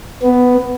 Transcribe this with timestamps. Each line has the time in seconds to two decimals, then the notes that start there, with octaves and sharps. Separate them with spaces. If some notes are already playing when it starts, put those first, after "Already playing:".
0.22 B3